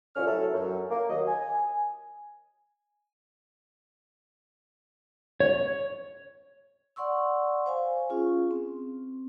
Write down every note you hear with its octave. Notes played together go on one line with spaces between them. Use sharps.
C2 D3 C#4 F4 C#5 F6
A2 F#3 E4 A4
F#2
A#3
D#2 F#3 D#5
G#5
C#5
D5 F#5 C6 C#6 E6
C5 F5 G#5
C#4 F4 G#4
C4